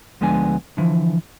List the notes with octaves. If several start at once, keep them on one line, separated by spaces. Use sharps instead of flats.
D2 F3 G#3 B3 D4 G#5
D3 E3 F3